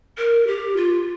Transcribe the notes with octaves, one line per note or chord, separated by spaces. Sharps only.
A#4
G4
F4